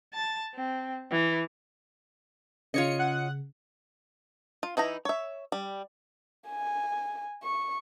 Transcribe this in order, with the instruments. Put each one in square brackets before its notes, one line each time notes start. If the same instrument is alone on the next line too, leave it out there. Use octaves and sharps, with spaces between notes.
[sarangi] A5
C4
E3
[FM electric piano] C#3 [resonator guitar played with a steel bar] F4 C#5 D#5 [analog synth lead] C#7
[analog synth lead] F#5
[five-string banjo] F4
E3 D#4 E4 A#5
C#5 E5
G3
[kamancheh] G#5
C#6